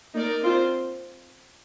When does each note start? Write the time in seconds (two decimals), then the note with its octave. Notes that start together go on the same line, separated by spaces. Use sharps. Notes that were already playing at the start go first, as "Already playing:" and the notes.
0.14 A#3 D#4 A#4 D5
0.43 C4 F4 C5